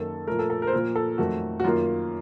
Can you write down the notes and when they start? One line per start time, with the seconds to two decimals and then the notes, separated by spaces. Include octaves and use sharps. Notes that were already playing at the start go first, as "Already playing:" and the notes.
Already playing: F#2 D#3 A#3 A4
0.27 A#2 F3 A3 A#4
0.39 A4
0.50 A4
0.62 A#4
0.67 C5
0.73 A#2 F3 A#3 A#4
0.96 A4
1.18 F2 D#3 F#3 A3 F#4
1.60 F#4
1.64 F#2 D#3 A#3 F4